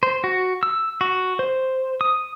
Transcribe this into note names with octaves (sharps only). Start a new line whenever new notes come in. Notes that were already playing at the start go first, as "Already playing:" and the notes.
C5
F#4
E6
F#4
C5
D#6